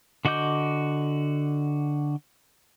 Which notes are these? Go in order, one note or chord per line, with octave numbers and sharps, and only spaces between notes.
D3 F#4 D#5 D6 G6